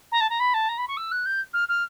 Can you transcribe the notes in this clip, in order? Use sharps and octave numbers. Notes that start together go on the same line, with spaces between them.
A#5
A5
A#5
B5
A5
A#5
B5
C#6
E6
F#6
G6
F6
F6